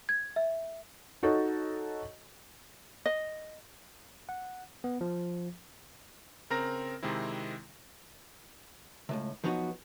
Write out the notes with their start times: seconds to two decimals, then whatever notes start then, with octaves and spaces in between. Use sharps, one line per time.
0.09 G#6
0.36 E5
1.23 D#4 F#4 A4 C#5 D#5
3.06 D#5
4.29 F#5
4.84 B3
5.01 F3
6.50 C#3 C4 A#4 A#5 A#6
7.03 C3 D#3 G#3 C4 E4
9.09 C#2 A2 C3
9.44 F3 F#3 B3 D#4 F#4